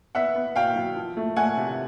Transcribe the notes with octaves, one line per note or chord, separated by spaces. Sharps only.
B3 E5 F#5
B3
B2 F5 G5
F#3
F3
A3
A3 F#5 G#5
C3